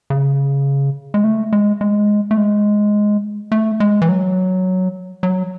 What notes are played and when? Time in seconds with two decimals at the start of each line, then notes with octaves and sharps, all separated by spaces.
0.10 C#3
1.14 G#3
1.24 A3
1.53 G#3
1.81 G#3
2.31 A3
2.37 G#3
3.52 A3
3.80 G#3
4.02 E3
4.09 F#3
5.23 F#3